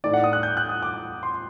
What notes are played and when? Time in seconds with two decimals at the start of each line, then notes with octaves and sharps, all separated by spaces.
0.04 A2 A3 D#4 D5
0.14 F#5
0.24 D#6
0.33 F#6
0.43 G6
0.57 F#6
0.69 D#6
0.82 D6
1.23 C6